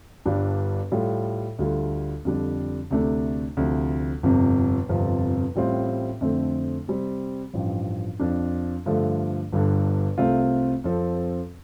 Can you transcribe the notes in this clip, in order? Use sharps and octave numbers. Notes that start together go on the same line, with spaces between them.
G1 G2 G3 D4
A2 G3 F4 A4
D2 D3 G3 F4 A4
F2 D3 G3 D4
D2 C3 A3 D4
D2 C3 F3
G1 F2 C3
G1 F2 C3 F3
A1 A2 G3 C4 F4
F2 D3 A3 C4
C3 G3 C4
A1 G2 F3
F2 F3 D4
G2 D3 F3 A3
G1 G2 D3
C2 C3 A3 C4 F4
F2 F3 C4 A4